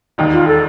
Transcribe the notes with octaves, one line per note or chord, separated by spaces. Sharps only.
E1 D#2 D#3
F4
A4